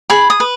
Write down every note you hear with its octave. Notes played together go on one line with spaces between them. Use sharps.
G#4 B5
D#6
B4